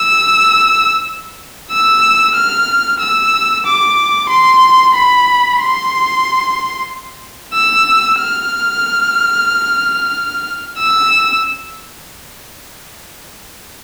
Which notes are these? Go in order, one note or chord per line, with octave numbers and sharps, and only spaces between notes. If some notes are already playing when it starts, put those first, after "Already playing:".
Already playing: E6
E6
F6
E6
D6
C6
B5
C6
E6
F6
E6